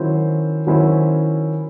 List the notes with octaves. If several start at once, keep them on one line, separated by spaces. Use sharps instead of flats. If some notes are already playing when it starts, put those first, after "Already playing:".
Already playing: D#3 F#3 C#4 E4 C5
D#3 F#3 C#4 E4 C5